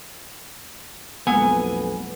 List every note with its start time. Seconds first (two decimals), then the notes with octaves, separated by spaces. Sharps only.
1.27 B1 F2 G#3 A#3 B3 B4 G#5 E6